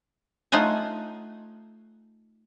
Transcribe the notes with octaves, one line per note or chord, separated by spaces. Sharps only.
A3 D#4 F4 F#5 G#5